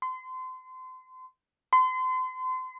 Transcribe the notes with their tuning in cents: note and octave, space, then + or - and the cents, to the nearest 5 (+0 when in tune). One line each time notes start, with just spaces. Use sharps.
C6 -30
C6 -35